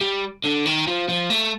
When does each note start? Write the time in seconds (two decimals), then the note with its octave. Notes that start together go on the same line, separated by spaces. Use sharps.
0.01 G3
0.44 D3
0.65 D#3
0.87 F3
1.09 F3
1.30 A3